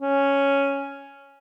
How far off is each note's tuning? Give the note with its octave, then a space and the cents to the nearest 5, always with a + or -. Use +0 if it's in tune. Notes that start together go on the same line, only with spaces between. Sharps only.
C#4 +0